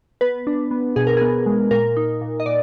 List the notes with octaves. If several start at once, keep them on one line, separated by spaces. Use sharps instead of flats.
B3 B4
D4
B3
B2 G#4
A#4
B3 G#4
G#3
A#2 A#4
D#4
A#2
D#5
A#2 D5